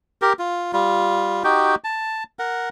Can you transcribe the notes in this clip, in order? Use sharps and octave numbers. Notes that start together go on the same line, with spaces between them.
G4 A#4
F4
G3 F4
D#4 F#4 G4 G5
A5
A#4 F#5